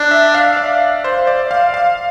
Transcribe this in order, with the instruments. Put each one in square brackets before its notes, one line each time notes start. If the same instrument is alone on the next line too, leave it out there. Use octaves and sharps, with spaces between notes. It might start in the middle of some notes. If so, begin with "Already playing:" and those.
Already playing: [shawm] D4 [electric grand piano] D5
[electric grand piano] E5
F5
D5
C5
D5
F5
F5